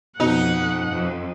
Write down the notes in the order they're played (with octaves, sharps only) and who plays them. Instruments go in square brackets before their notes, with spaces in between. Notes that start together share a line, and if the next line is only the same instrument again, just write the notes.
[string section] F2 [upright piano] B2 [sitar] D#4 [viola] F#5
[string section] F2